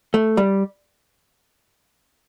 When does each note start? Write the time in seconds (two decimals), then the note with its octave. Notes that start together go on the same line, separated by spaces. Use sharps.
0.14 A3
0.37 G3